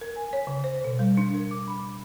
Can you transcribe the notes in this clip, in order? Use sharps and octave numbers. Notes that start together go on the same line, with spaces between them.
A#4
G#5
C#5
C#3
C5
B2
G3
D4
A#4
D6
B5